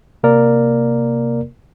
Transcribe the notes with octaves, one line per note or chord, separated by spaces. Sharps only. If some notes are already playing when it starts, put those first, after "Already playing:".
C3 A#3 A#4 D5